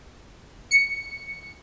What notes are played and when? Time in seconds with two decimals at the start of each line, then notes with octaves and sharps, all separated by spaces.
0.71 C#7